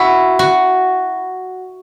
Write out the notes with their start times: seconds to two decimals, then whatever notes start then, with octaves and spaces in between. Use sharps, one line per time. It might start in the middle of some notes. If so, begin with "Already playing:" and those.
Already playing: E4 F#4
0.39 F#4